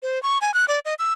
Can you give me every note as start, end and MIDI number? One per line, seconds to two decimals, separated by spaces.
0.03 0.21 72
0.23 0.38 85
0.41 0.53 80
0.54 0.65 90
0.68 0.79 74
0.85 0.94 75
0.99 1.13 88